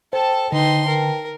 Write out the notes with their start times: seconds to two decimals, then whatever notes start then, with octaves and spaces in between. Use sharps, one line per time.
0.13 A4 C5 G5 A5
0.52 D3 D#4 B4 G5 A5 C6
0.87 A#4